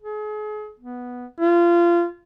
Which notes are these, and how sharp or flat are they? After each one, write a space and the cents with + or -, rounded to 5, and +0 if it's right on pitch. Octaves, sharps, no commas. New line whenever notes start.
G#4 +35
B3 -5
F4 -25